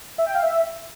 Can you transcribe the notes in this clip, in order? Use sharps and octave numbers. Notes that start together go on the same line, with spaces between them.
E5
G5
F5
E5